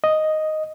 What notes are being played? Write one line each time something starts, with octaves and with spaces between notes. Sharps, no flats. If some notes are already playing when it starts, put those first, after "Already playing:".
D#5